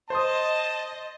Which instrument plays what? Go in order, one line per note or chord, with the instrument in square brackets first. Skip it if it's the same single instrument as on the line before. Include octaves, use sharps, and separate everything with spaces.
[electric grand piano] C5 C6 D#6 [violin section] D#5 [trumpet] A5